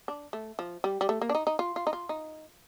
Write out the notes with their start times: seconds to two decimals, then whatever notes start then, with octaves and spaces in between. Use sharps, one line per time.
0.08 D4
0.33 A3
0.59 F3
0.84 G3
1.01 G3
1.09 A3
1.22 A#3
1.30 D4
1.35 D#4
1.47 D#4
1.59 F4
1.76 F4
1.87 D#4
1.93 F4
2.09 D#4